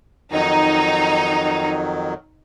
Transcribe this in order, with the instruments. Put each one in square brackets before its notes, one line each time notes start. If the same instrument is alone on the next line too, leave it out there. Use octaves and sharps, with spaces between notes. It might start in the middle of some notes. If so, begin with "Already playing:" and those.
[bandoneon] F2 D#3 F#3 [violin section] D#4